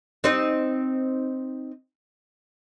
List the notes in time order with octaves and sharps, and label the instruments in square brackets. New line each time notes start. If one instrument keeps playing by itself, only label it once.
[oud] C4 D#4 D#5